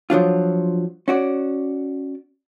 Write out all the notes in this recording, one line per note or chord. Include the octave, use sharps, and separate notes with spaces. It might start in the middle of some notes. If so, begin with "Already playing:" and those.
F3 F#3 D4 F4
C#4 F#4 D5